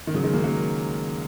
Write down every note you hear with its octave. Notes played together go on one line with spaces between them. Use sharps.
D#3
C#3 F#3
D#3 G#3
F#3 A#3
F#3 A#3